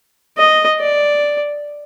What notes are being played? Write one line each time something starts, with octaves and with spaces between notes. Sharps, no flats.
D#5
D5